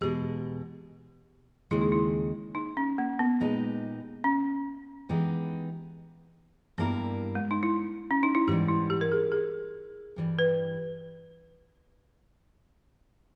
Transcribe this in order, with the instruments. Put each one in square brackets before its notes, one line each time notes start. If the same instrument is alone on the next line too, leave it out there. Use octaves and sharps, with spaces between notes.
[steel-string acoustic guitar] E2 B2 G#3 [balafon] G4
[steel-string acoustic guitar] D#2 C#3 G#3 [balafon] E4
[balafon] D#4
E4
D#4
C#4
A#3
B3
[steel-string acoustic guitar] A#2 G#3 D#4 G4 B4
[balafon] C#4
[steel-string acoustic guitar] E3 G#3 B3 D#4 G4
[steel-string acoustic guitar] G2 G3 A#3 E4 A#4 [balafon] B3
[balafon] G#3
D#4
E4
C#4
D#4
E4
[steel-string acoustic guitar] G#2 E3 G3 [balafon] G4
[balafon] E4
G4
A#4
G#4
G#4
[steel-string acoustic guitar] G2 E3 G3
[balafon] B4